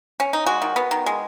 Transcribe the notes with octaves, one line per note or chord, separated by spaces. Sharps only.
C#4
D#4
G#3 F#4
D#3
B3
D#3
G#3